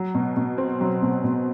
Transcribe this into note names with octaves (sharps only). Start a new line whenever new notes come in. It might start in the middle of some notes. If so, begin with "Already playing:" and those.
Already playing: F#3
B2
B2
C4
F#3
B2
B2